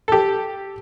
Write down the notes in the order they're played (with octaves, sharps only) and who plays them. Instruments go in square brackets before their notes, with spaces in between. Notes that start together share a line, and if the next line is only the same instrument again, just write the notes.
[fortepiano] G4 A4